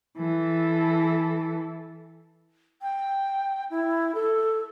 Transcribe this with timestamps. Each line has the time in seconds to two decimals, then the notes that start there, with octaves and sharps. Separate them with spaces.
0.19 E3 A4
2.82 G5
3.70 E4
4.15 A4